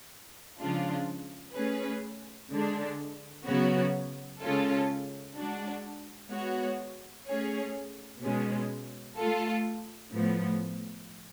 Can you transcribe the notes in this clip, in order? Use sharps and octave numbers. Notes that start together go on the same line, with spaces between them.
C#3 F3 G#3 D4 F4
A3 C#4 G#4 B4
D3 G#3 D4
C#3 F#3 B3 F#4 C#5
C#3 G#3 C#4 F4 A4
G#3 D4 F#4
G#3 B3 F#4 C#5
A3 C#4 G#4 C#5
B2 G#3 C#4
A3 F4 A4
A2 F3 B3